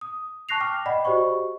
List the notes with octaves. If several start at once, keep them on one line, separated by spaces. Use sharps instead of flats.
D#6
A5 C#6 F#6 A#6 C7 F7
G5 D6 F6
D5 D#5 F#5 G5 B5
F#4 G4 C5 D#5 C#6